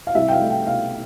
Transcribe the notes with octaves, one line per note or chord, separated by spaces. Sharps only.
F5
C2 E5
G5
F5
A3
G5
B2 F5